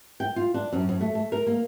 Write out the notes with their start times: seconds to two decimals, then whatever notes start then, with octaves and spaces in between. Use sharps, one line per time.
0.20 G5
0.36 F4
0.54 D4
0.72 F#2
0.89 F#2
1.01 A3
1.15 A3
1.32 A#4
1.47 A#3